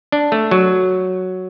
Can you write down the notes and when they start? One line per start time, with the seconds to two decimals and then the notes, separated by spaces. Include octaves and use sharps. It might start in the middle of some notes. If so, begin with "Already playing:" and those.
0.12 D4
0.32 A3
0.51 F#3